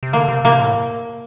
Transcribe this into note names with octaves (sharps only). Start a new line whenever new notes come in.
C3
D3 A#3
C3
C3 A#3
A2